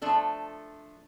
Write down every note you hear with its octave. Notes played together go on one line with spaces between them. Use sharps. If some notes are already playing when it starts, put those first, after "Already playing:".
F3 A3 D4 A4